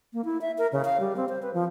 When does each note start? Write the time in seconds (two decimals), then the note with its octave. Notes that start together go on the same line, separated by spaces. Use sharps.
0.13 A#3
0.25 E4
0.41 E5
0.58 A#4
0.72 C#3
0.85 F5
1.00 G3
1.16 C4
1.29 C5
1.42 B4
1.54 F3